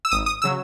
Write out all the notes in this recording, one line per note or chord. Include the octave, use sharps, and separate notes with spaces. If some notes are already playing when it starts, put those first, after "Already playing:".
E6
G#1 D#6
D#6
C#3 F#3 E6